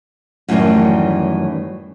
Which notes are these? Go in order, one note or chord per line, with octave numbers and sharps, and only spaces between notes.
F#2 A2 D#3 E3 G3